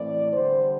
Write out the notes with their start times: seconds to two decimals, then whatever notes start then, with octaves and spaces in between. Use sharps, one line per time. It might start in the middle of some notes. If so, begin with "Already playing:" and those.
Already playing: A2 E3 A3 C4 D5
0.33 D3 G3 B3 C5